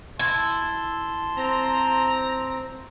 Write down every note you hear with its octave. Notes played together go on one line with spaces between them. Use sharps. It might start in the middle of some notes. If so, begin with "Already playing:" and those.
E4 A5 C6
C4 A#5